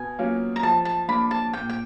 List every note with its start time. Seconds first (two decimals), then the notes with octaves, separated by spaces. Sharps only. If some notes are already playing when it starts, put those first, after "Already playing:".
Already playing: B2 G#5
0.19 F#3 A#3 C#4 F4
0.56 A#5
0.63 F3 A5
0.85 A5
1.08 A#3 D4 B5
1.31 A5
1.53 A#2 G5
1.70 G5